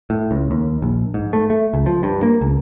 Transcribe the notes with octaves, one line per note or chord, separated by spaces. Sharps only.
A2
C#2
D#2
A#1
G#2
A3
A3
C#2
F3
G2
A#3
C#2